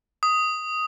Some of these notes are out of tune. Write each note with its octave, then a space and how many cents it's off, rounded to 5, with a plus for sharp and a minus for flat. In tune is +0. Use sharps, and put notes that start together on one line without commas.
D#6 +5